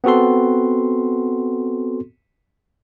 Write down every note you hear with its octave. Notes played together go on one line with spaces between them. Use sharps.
B3 C4 F#4 A4 C6